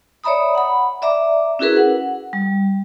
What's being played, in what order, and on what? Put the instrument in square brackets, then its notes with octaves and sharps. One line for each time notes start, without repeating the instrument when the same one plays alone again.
[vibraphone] C#5 D5 E5 A#5 B5 D#6
F#5 B5
D5 E5 A#5 D6
C#4 E4 F#4 G#4 A#4 B4
F#5
G3